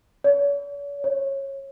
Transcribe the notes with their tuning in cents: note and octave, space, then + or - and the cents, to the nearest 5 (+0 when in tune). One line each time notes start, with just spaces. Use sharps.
C#5 +45
C#5 -20